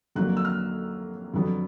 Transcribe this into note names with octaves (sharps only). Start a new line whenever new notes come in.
F2 D3 F#3 A#3 F#6
E6
F6
F2 D3 F#3 B3